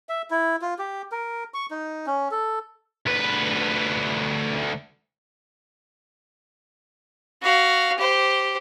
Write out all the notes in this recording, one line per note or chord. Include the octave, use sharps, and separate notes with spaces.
E5
E4
F4
G4
A#4
C#6
D#4
C#4
A4
D2 B4
F#4 F5
G4 C5